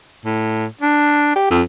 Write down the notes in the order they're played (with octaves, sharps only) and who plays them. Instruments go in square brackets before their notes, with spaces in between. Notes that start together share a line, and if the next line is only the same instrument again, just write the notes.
[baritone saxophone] A2
D4
G4
F2